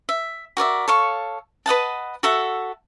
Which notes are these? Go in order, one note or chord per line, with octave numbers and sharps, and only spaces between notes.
E5
F#4 A#4 D5 E5
A4 C#5 F5 C#6
B4 D#5 F#5 A5
F#4 A4 E5 F#5